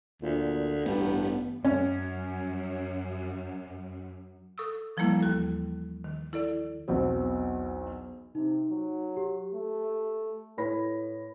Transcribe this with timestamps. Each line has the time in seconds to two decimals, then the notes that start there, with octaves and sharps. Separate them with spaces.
0.22 D2 A#2
0.86 A1 G2 B3
1.65 F#2 C#4
4.58 A4 C#6 D#6 E6
4.97 E3 F3 G3 A3 A#3 E4
5.21 D#2 F#4 A4
6.04 D#3
6.33 E4 A4 D5
6.88 B1 E2 F#3 C4
8.35 C3 D#4
8.70 F#3
9.17 G4
9.54 A3
10.57 A2 E4 B4 C#5 B5 A#6